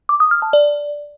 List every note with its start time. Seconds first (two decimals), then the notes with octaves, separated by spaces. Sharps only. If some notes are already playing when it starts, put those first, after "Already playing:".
0.09 D6
0.20 D#6
0.31 F6
0.42 A5
0.53 D5